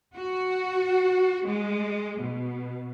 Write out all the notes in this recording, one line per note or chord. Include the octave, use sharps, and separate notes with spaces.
F#4
G#3
B2